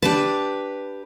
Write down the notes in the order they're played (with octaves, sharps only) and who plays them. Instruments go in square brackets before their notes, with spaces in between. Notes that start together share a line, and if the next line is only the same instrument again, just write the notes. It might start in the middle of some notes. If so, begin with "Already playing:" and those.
[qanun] D4 A5 [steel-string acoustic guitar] G4 B4